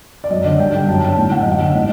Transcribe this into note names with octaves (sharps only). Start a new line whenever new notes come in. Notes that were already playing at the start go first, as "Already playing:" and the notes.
D5
F#2 D#5
D3 D5
G2 G5
D3 G5
F#2 A5
D3 A5
A2 G5
F#5
F#2 D#5
F#5
D3
A2 D#5